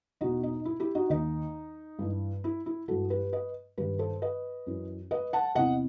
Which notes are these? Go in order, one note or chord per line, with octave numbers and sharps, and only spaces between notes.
E2 B2 D#4 F#4
D#4
E4
E4 G4
D#4 F#4
D#2 D#3 D#4
G2 E3
E4
E4
G2 E3 F#4 A4
G4 B4
B4 D#5
G2 D#3 G4 B4
A4 C5
B4 D#5
F#2 E3
B4 D#5
F#5 A5
E2 C3 E3 D#5 F#5